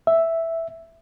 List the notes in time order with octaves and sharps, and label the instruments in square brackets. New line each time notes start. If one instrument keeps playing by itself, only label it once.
[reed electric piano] E5